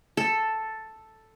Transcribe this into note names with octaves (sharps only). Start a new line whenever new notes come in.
A4